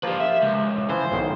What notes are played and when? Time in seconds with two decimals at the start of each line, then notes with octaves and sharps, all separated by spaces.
0.03 F3 A#3 F4 G4 B4
0.20 E5
0.42 C#2
0.90 E3 F3 C5
1.12 B1 G#2 D#3